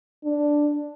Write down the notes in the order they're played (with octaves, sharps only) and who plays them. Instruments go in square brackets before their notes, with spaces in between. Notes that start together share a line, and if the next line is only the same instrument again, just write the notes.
[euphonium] D4